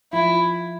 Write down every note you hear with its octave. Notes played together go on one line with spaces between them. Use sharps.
F3 E4